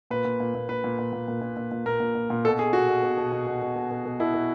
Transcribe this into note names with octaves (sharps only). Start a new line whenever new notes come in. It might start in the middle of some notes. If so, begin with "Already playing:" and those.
A#2 B4
A#2
A#2
A#2
A#2 B4
A#2
A#2
A#2
A#2
A#2
A#2
A#2
A#2 A#4
A#2
A#2
A#2
B2 A4
B2 G#4
B2 F#4
B2
B2
B2
B2
B2
B2
B2
B2
B2
B2 E4
B2